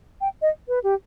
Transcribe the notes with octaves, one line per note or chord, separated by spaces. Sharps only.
G5
D#5
B4
G4